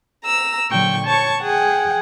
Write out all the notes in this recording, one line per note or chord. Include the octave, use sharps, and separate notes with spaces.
A#5 E6
A#2 D3 F#3 G5 C#6
C#5 A5 C#6
G#4 F#5 G5